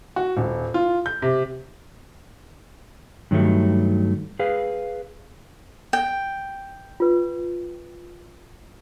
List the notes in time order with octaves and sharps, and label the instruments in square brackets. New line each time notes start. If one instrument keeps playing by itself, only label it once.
[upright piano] F#4
D#1
F4
G6
C3
[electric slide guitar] G2 D#3 F#3 G3 A3
G#4 B4 F5
[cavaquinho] G5
[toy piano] F4 B4